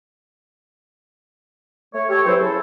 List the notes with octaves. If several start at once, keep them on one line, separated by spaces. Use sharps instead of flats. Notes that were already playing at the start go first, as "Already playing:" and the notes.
A3 C#5
G4 A4 C#5
E3 F#3 C4 C5
C#3 E4 A4